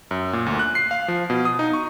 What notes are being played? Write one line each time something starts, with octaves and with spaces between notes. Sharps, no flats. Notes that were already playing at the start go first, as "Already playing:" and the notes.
F#2
A#2
D2
F#6
C7
F5
F3
B2
D#6
D#4
C#6